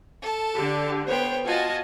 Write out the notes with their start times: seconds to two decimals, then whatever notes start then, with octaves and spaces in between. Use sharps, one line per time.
0.22 A4 A5
0.54 D3 G4
1.07 B3 C5 C#5 G5
1.46 F4 F#4 D#5 G#5 A5